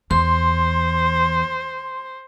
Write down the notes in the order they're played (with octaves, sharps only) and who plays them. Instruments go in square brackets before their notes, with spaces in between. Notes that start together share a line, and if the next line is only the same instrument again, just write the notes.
[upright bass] E2 [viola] C5 [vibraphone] C6